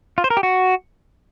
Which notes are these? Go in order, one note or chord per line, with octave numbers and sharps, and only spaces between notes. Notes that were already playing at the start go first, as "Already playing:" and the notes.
F4
C5
A#4
G4
F#4